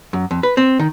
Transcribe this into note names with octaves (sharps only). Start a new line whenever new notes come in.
F#2
F2
B4
C4
D#3